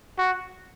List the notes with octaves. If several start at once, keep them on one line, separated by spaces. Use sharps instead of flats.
F#4